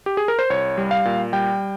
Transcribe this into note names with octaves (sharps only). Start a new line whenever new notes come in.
G4
G#4
A#4
C5
C2 C#5
G3
F5
A#2
G3 G5